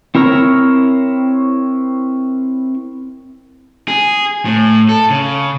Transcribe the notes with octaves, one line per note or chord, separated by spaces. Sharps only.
C4 E4 A#4 C#5 A#5
G#4
A2
A4
C#3